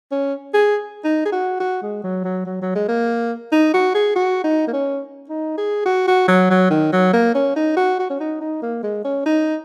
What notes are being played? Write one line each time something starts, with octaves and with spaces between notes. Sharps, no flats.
C#4
G#4
D#4
G#4
F#4
F#4
G#3
F#3
F#3
F#3
F#3
G#3
A#3
D#4
F#4
G#4
F#4
D#4
A#3
C#4
D#4
G#4
F#4
F#4
F#3
F#3
D#3
F#3
A#3
C#4
D#4
F#4
F#4
C#4
D#4
D#4
A#3
G#3
C#4
D#4